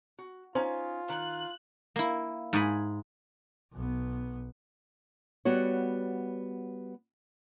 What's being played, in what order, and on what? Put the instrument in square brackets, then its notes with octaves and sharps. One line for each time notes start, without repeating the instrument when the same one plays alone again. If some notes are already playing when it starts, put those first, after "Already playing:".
[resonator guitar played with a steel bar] F#4
[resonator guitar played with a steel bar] C#4 D#4 G#5 [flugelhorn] F4 [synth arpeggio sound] C5
[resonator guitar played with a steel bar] D#3 [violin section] F#6
[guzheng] A#3 E4
G#2 G#4 G#5 B5
[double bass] B1 B3
[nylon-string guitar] G3 B3 F#4 C#5